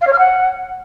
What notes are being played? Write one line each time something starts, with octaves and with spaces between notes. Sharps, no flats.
F5
C#5
F6
F#5